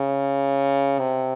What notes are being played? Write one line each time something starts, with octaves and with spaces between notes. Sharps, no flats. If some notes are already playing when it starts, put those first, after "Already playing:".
Already playing: C#3
C3